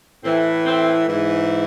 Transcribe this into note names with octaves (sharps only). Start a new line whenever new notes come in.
A2 E3 C4
C4
G#2 E3